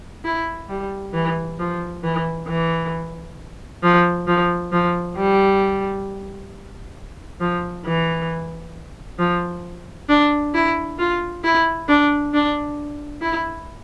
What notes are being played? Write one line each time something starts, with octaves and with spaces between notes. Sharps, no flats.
E4
G3
E3
F3
E3
E3
F3
F3
F3
G3
F3
E3
F3
D4
E4
F4
E4
D4
D4
E4